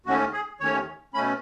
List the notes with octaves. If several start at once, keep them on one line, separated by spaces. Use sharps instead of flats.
D#2 D#3 A3 C#4 F#4
G#4
D#2 D#3 A3 C#4 C#5
B2 A3 C#4 B5